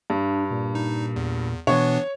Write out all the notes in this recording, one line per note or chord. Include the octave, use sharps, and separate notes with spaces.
G2 D4
A#2
D#4
E2
B2 E3 B3 D4 C#5